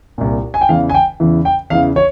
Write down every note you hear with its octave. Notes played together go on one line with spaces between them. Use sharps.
C2 A#2
G#5
G5
E2 C#3 E3 F5
G#5
G5
E2 C#3 E3
G5
E2 C#3 E3 F5
C#5